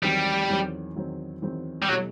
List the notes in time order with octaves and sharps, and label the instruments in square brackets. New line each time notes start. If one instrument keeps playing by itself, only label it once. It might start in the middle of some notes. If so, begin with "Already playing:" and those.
[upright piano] E2 D#3 F#3 C4 [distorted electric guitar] G3
[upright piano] E2 D#3 F#3 C4
E2 D#3 F#3 C4
E2 D#3 F#3 C4
[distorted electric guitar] G3
[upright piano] B2 A3 E4 G4 [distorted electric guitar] F#3